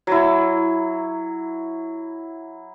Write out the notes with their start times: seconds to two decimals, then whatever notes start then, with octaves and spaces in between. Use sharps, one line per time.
0.07 F#3 E4